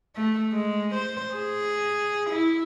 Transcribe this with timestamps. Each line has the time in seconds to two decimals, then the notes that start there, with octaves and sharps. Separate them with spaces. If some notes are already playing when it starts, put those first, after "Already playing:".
0.16 A3
0.52 G#3
0.95 C5
1.35 G#4
2.30 E4